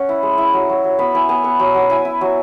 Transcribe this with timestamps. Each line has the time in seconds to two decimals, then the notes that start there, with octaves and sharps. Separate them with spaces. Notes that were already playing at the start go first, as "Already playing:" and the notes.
Already playing: C#4 F#5
0.09 E4
0.23 G#3
0.38 E4
0.54 F#3
0.69 F#3
0.84 F#3
0.99 B3 B5
1.15 E4 G#5
1.29 B3 G#5
1.44 B3 F#5
1.59 F#3
1.74 F#3
1.90 E4 G#5
2.05 E4
2.21 F#3